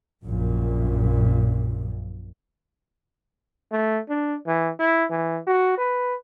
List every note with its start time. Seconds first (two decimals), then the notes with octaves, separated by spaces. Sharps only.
0.23 A#1 F#2 A#2
3.72 A3
4.09 D4
4.47 E3
4.79 E4
5.10 E3
5.47 F#4
5.78 B4